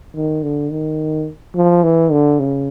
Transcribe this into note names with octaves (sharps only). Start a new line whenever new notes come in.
D#3
D3
D#3
F3
E3
D3
C#3